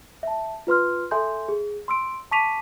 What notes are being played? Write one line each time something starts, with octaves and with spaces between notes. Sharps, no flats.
E5 A5
F4 B4 C6 F6
A4 E5 G#5 C6 G6
G#4
C6 E6 D7
A5 C#6 D6 B6 D#7 F7